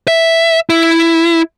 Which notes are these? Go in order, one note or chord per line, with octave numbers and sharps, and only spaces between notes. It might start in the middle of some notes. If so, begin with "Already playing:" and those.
E5
E4